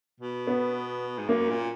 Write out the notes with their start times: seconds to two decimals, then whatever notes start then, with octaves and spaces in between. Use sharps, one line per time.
0.20 B2
0.47 B3
1.18 G#2
1.29 F#2 A#3
1.49 A#2